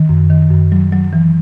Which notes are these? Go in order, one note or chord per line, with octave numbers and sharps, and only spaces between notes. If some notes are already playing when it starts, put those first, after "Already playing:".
Already playing: D#3
F#2
D#3
F#2
F#3
F#3
E3